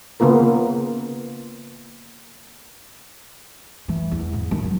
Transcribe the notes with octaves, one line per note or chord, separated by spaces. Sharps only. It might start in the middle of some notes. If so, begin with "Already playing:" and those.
C#3 A#3 B3 F4 A#4
E3
E2
G#2
D#3
F#3